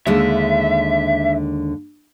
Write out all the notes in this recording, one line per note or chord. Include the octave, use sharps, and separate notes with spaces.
D#2 D3 G#3 E5